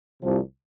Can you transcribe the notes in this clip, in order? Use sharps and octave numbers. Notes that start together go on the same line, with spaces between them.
C2 C3 F3